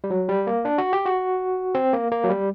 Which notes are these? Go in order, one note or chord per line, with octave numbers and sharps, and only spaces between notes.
G3
F#3
G3
A#3
D4
F#4
G4
F#4
C4
A#3
A#3
F#3
G3